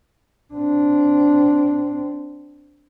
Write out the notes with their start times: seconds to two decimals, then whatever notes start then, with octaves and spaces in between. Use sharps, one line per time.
0.54 C4 D4